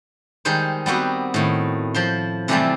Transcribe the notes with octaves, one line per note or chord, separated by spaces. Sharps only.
D#3 G3 G#3 D#4 C5
G3 B3 C4 F#4
A2 D#3
F3 C5 C6
C3 E3 F3 G3 A3 C4